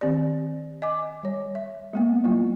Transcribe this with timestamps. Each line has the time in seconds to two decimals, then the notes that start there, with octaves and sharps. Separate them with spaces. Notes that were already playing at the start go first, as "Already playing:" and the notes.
0.01 D#3 C4 G4 D5
0.82 D#5 G#5 D6
1.23 G3 C#5
1.55 E5
1.93 G#3 A#3 B3
2.24 F#3 G3 A#3 B3 E4 F4